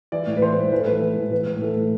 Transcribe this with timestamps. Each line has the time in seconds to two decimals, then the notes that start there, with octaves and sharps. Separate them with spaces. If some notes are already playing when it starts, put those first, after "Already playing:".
0.12 E3 D5
0.27 A2
0.37 B4
0.41 E3 C5
0.57 A2
0.72 E3 B4
0.79 A4
0.86 A2 B4
1.02 E3
1.17 A2
1.32 E3 B4
1.46 A2
1.62 E3 A4
1.76 A2